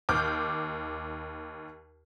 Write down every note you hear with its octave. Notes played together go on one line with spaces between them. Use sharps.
D#2 D6 F6 G6